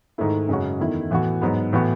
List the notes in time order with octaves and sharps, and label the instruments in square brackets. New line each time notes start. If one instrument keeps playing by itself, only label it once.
[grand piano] G#2 D#3 A3 E4
F#2 C#3 G#3 C#4 F#4
E2 D#3 A3 E4
A2 E3 B3 F#4
G#2 F#3 B3
A2 E3 B3 F#4